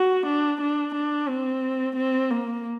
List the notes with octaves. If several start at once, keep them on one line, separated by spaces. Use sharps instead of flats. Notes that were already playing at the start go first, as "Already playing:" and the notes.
Already playing: F#4
D4
D4
D4
C4
C4
A#3